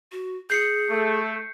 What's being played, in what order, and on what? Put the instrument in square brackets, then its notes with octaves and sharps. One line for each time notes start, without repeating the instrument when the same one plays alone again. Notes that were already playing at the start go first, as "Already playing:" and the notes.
[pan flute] F#4
[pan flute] G#4 [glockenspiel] G6 C7 C#7
[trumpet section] A3